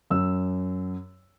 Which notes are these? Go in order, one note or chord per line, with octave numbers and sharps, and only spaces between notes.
F#2 E6